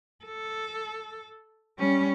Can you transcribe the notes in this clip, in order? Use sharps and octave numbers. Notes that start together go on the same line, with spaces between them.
A4
G3 C#4